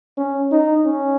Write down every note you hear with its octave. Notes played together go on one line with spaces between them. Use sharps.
C#4
D#4
C#4